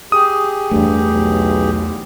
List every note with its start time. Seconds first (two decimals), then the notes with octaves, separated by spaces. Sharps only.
0.12 G4 G#4 D#6
0.71 E2 G2 A3
1.11 B1